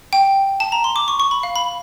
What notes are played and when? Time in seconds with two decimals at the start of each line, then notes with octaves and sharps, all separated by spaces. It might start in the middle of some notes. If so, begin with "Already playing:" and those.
0.13 G5
0.60 A5
0.72 A#5
0.84 C6
0.96 D6
1.08 C#6
1.20 C#6
1.31 B5
1.43 F5
1.56 B5